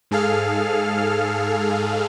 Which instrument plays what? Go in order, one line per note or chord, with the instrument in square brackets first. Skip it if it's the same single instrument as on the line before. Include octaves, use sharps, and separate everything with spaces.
[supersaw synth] G#2 G#4 A4 F5 F6